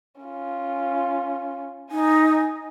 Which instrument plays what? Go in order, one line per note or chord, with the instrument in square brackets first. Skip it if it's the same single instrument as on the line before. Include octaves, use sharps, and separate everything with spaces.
[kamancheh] C#4 F4
[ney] D#4 [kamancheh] G#5